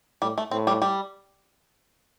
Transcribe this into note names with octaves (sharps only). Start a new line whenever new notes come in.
A2 G3
A3
A2 C4
G3
G3